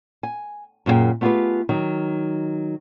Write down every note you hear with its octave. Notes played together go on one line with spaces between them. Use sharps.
G#5
F#2 A#2 F#4 G#4 G5
A3 B3 F4 G4 G#4 B4
D#3 F#3 D#4